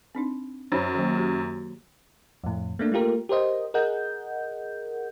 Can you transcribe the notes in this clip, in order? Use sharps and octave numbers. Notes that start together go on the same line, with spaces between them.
C4 D4 D#4
F#2 C5 C#5 B5
D#3 F#3 A#3
F#4 G4
F2 A2
A3 A#3 D4
A3 A#3 F4 G4 A#4
G4 A#4 C5 D#5
G#4 A#4 D#5 F#5 G6